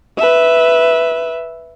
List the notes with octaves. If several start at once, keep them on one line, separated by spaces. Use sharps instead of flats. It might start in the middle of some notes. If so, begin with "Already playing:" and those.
B4 E5